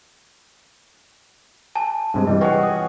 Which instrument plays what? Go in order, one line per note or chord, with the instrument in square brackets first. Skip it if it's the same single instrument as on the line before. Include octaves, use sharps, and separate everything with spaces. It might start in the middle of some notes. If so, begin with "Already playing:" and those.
[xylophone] G#5 A5
[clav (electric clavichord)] G2 C3 G#3
[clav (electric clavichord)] E3 G3 [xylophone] D#5
[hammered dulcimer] F#4 G#4 C#5 [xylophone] B4 G5
[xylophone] D#6